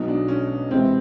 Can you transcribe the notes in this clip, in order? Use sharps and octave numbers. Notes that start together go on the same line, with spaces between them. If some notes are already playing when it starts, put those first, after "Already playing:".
Already playing: B1 B2 F#3 D#4
D4
C#4
C#2 C3 E3 C4